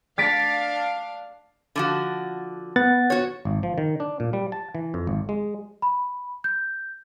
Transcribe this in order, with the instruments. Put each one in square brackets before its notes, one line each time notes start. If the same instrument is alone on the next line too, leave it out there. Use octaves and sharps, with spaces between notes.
[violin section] D4 F5 [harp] A6 B6 D7
[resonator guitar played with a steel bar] D3 F3 F#4
[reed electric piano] B3 F#5 A6
[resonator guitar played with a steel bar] F#4 C#5
[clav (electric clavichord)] G#1
F3
D#3
D4
A#2
G3
A5
E3
F2
G#1
G#3
[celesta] B5
G6